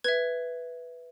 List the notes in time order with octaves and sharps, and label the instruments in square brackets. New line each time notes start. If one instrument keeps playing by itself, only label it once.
[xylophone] B4 E5 G#6